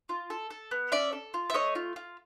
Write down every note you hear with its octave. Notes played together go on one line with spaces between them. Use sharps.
F4
A4
A4
B3
C#4 D5 E5
A4
F4
E5
A3 C#5 D#5
F4
F4